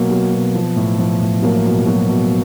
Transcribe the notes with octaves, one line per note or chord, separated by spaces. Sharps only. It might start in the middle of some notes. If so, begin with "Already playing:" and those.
Already playing: B2 F#3 A#3
F#3
B2
F3
A2
F3
A2
F#3 A#3
B2
F#3
B2